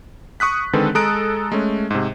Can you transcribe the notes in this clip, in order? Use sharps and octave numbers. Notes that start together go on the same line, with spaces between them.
C#6 D#6 F#6 B6
D3 D#3 G#3 C4 A4 B4
G#3 A4 A#5 D#6 F#6 D7
G#3 A3 C#4
G#2 C3